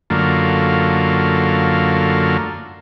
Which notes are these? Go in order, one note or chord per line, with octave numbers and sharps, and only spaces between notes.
F#2 D3 A3 A#3 F4